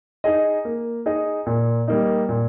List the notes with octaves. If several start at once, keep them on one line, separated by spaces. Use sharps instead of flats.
D#4 G#4 D#5
A#3
D#4 G#4 D#5
A#2
G3 A#3 D#4
A#2